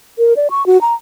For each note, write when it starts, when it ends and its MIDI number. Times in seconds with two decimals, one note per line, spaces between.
0.18 0.34 70
0.37 0.48 74
0.51 0.65 85
0.66 0.80 66
0.81 0.94 82